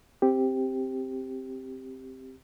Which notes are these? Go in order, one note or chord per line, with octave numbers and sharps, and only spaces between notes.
C4 G4